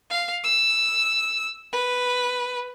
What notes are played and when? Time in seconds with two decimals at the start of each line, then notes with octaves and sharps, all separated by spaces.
0.10 F5
0.44 E6
1.72 B4